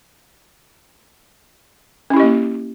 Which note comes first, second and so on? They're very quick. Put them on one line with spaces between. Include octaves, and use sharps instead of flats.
C#4 E4 G4 D#5 A#3